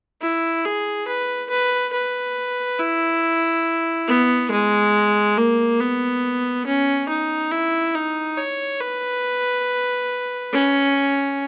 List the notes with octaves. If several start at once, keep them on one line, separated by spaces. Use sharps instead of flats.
E4
G#4
B4
B4
B4
E4
B3
G#3
A#3
B3
C#4
D#4
E4
D#4
C#5
B4
C#4